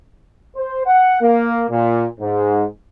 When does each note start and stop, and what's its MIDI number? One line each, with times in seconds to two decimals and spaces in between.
0.56 0.84 72
0.86 1.19 78
1.21 1.65 58
1.71 2.05 46
2.20 2.65 44